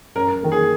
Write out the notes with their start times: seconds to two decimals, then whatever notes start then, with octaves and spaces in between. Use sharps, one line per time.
0.15 F#2 A#4
0.43 D#3 A#3
0.52 G#4